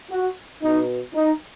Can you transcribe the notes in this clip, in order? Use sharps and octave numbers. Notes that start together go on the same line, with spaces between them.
F#4
B2 B3 D#4
D#4